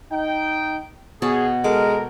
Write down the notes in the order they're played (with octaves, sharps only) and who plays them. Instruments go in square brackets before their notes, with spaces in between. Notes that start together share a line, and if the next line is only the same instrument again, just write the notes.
[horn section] D#4 G5
[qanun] B2 C#5 A5 [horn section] G#4
[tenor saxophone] G#3 [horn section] A4 A#4 [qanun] D6